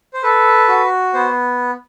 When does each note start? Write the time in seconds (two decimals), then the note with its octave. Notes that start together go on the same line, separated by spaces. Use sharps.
0.13 C5
0.23 A4 B4
0.68 F#4
1.14 B3 C5